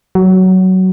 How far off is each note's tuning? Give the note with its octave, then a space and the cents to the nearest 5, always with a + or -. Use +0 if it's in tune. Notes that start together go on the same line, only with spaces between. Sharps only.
F#3 +15